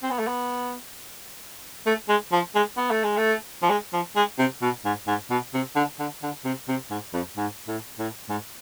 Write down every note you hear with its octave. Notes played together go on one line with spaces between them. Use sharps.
C4
B3
A3
B3
A3
G#3
F3
G#3
B3
A3
G#3
A3
F3
G#3
F3
G#3
C3
B2
G#2
G#2
B2
C3
D3
D3
D3
C3
C3
G#2
F2
G#2
A2
A2
G#2